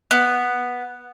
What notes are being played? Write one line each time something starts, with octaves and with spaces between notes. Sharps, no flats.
B3